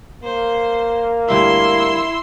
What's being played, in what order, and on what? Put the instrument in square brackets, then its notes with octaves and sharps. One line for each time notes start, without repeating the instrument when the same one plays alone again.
[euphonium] A#3 [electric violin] C5
[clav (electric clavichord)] D2 G3 E5 [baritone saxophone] E4 [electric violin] C6 E6